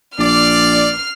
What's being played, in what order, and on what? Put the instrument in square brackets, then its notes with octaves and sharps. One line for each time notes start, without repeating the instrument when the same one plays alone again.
[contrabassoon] A#1 [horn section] D5 [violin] F6 C7